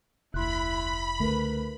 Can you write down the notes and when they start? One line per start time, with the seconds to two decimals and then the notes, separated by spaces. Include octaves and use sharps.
0.34 F1 D2 E4 B5 C6 F#6
1.19 C#2 D3 A3 A#4 B4